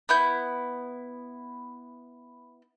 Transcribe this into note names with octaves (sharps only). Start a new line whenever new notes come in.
B3 E4 G6